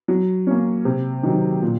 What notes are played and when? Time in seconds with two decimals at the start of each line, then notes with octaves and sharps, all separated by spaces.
0.08 F#3
0.47 A#3 C#4
0.85 C3
1.23 D#3 F#3
1.62 A#2